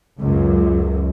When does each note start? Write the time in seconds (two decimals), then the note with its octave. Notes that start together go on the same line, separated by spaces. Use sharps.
0.19 C#2 F#2